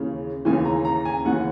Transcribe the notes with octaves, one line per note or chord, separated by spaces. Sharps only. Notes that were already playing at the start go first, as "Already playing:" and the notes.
Already playing: D#2 C#3 E3
D#2 C#3 E3 G#5
A#5
A#5
G#5
D#2 C#3 E3 F#5